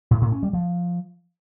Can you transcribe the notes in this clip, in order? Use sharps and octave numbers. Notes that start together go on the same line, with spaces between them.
A2
A2
C#4
G3
F3